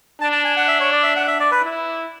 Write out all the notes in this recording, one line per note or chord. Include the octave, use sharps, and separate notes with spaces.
D4 A5
A5
G#5
F#5
E5
C#5
D5
E5
F#5
E5
D5
B4
E4